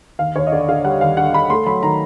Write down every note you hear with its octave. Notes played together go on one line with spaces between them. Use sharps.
D#2 F5
D#2 C#5
D#5
D3 D5
D3 F5
G3 F#5
D#2 F5
D3 F#5
D3 B5
A3 C6
F#3 B5
D#3 A#5